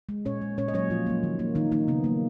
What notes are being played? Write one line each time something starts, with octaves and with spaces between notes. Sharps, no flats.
G#3
A#2 C#4 C#5
G#3
A#2 C#4 C#5
D#5
F#3 A#3 C#4 C#5
A#2 F3 F4
F#3 A#3
D#3
A#3
D#3 D#4
D#3 A#3 D#4
C#3 B3
F#3 A#3